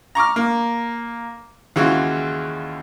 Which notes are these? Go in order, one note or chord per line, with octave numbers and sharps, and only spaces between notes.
A#5 C#6 D6 F6
A#3
D#2 C#3 E3 G#3 F4 F#4